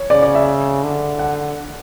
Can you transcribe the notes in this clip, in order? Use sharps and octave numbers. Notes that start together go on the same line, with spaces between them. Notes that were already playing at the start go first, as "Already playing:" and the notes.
Already playing: C#5
C#3 D5
D5
E5
D3
F#5